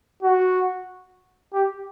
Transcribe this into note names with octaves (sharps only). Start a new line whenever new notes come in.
F#4
G4